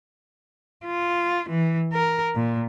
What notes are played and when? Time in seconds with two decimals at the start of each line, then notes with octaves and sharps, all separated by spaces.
0.85 F4
1.49 E3
1.93 A#4
2.36 A#2